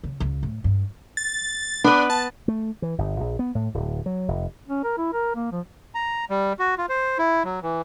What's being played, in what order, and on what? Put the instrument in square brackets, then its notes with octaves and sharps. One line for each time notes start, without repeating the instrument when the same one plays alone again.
[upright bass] C#3
C#2
A2
G2
[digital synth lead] A6
[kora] B3 B4 [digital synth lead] D4
[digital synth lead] A5
[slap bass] A3
E3
G1
A#1
B3
A2
D1
F#3
F1
[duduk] C#4
A#4
E4
A#4
A#3
F3
[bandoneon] A#5
G3
F#4
F4
C5
E4
F#3
E3